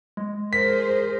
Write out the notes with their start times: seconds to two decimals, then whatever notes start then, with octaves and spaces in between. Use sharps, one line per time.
0.17 G#3
0.53 G#4 A#4 C5 B6